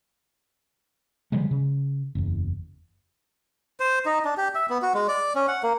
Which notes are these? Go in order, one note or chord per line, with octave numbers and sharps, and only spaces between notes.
D3 F3 G3 G#3
C#3
F#1 E2
C5
D#4
D4
G4
E5
B3
F#4
G#3
D5
C#4
F#5
A#3